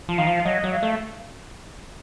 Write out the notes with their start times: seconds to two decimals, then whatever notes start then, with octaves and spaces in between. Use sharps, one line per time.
0.09 F3
0.18 D#3 F5
0.27 F3
0.36 F5
0.45 F#3 D#5
0.64 F#3
0.73 F5
0.83 A3